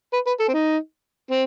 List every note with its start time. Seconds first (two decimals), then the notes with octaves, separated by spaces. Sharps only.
0.13 B4
0.27 B4
0.40 A4
0.48 C4
0.53 D#4
1.31 C4